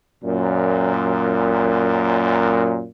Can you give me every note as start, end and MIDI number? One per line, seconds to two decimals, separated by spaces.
0.24 2.87 42
0.24 2.87 46